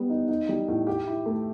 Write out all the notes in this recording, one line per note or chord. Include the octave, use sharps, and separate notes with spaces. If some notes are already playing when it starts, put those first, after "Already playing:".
Already playing: G3 B3
D#4
D#4
G3
A2
G4
E4
A3